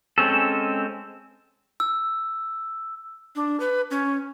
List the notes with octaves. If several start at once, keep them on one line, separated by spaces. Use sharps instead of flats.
G#3 C4 C#4 A4
E6
D4
B4
C#4